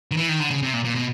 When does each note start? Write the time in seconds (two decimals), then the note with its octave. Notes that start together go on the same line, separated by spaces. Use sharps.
0.11 D#3
0.17 E3
0.29 D#3
0.40 D3
0.51 C#3
0.62 C3
0.73 A#2
0.84 A#2
0.95 B2